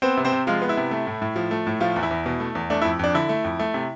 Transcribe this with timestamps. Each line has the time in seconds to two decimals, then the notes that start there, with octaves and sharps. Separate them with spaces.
0.02 B3 C4 C5
0.17 C3
0.25 C4 C5
0.32 C3
0.47 F3 G#3 F4
0.62 B3
0.69 E4
0.77 C3
0.91 A3
1.07 A2
1.22 A2
1.36 F3
1.51 A3
1.67 A2
1.80 F3 A3 F4
1.96 E2
2.03 E4
2.11 E2
2.26 B2
2.40 A3
2.55 E2
2.70 A3 D4
2.82 E4
2.85 F2
2.99 F2 D4
3.14 D3 E4
3.29 A3
3.44 F2
3.59 A3
3.74 C3